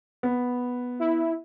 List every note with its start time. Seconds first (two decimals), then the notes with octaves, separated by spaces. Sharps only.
0.23 B3
0.99 E4